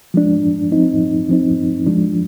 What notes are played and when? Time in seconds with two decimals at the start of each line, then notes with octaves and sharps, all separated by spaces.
0.14 F3 G#3 D4
0.72 F3 C4 D#4
1.29 F3 C4 D#4
1.86 F3 G#3 D4